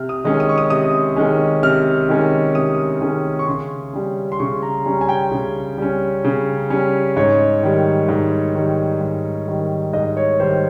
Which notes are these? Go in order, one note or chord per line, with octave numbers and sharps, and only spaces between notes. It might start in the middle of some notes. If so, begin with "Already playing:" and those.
Already playing: C3 F6
D#6
D#3 G#3 C#4
D#6
C#6
D#6
C3 D#6
D#3 G#3 C#4
C3 F6
D#3 G#3 C#4
C3 D#6
D#3 G#3 C#4
C#6
C#3 C6
G3 C#4
C6
C#3 C#6
A#5
G3 C#4 A#5
G#5
G5
C#3
G3 C#4
C#3
G3 C#4
G#2 C#5
D#3 G3
G#2
D#3 G3
G#2
D#3 G3
G#2 D#5
C#5
D#3 G3 C5